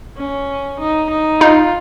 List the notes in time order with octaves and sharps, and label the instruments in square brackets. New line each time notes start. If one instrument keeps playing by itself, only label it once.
[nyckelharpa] C#4
D#4
D#4
[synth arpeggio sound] D#4 [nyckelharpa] F4